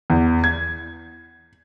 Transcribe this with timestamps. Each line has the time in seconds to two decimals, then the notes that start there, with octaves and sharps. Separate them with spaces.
0.10 E2
0.44 G#6